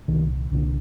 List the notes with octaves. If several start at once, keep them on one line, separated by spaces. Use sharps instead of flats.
C2 A#2 D#3
C2 A#2 D3